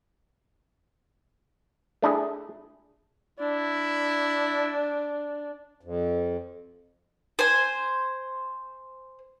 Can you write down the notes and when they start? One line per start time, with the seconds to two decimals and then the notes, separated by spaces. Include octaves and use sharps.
2.02 A3 D4 E4 G#4
3.39 D4 E4
5.81 F2
7.39 C5 G#5